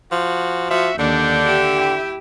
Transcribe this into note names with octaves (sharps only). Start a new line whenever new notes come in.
F3 F#4
F3 F#4 E5
D#2 D3 D4 G6
G4 E5
E4 G5